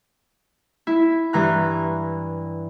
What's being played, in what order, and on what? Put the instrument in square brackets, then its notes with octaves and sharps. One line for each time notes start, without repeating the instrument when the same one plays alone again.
[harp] E4
G2 E3 A#5 F#6